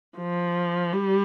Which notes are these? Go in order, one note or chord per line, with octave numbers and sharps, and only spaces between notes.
F3
G3